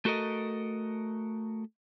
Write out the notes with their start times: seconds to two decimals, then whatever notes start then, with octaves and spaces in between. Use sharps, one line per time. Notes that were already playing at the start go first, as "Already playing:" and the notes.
0.05 A3 F#4 A4 A#4 D#5